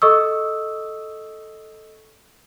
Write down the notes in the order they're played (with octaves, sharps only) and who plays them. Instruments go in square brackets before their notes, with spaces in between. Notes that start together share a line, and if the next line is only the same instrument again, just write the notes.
[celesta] A4 D#5 C#6 D#6 E6